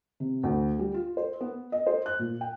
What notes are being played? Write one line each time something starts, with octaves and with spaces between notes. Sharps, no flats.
C3
D2
G3
F4
C5
B3
D#5
C5
F#6
A#2
G5